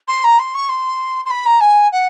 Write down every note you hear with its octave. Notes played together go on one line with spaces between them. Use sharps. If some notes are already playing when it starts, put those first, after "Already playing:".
C6
A#5
C6
C#6
C6
C6
B5
A#5
G#5
F#5